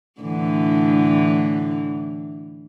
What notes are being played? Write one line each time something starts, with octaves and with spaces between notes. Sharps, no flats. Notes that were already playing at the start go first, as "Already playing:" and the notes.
A2 D3 E3